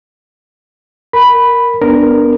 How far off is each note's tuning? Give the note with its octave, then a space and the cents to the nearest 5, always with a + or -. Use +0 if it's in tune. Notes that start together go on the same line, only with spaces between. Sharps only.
A#4 +0 B5 +0
B3 +0 D4 +0 A#4 +0